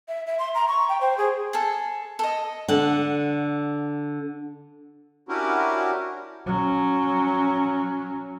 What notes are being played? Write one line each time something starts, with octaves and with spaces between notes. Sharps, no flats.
E5
E5
C6
A#5
C#6
G5
C5
G#4
G#4 A4
A4 D#5
D3 F#5
C#4 D4 E4 F#4 G4 A#4
F#3 C#4